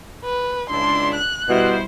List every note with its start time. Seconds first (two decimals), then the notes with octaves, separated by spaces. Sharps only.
0.25 B4
0.70 C#2 D4 E4 C6
1.15 F#6
1.49 B2 G3 E4 C5